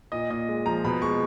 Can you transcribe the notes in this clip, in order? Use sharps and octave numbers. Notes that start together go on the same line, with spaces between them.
A#2 D#5
A#2 D#5
G#3
F3 A#5
B2 B5
G#3 C#6